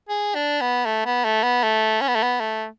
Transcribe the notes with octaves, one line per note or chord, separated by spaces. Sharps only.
G#4
D4
B3
A3
B3
A3
B3
A3
C#4
B3
A3
B3
A3